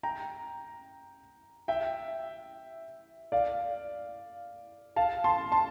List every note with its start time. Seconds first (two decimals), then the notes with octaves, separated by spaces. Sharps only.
0.03 G5 A#5
1.68 E5 G5
3.32 D5 F5
4.96 F5 A5
5.24 A5 C6
5.52 A5 C6